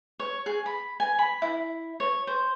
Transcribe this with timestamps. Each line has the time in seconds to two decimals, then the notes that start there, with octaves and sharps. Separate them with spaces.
0.19 C#5
0.46 G#4
0.66 B5
1.00 G#5
1.19 B5
1.42 E4
2.00 C#5
2.27 C5